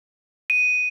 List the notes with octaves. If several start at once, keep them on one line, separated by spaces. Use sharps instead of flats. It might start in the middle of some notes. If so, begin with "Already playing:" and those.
D#7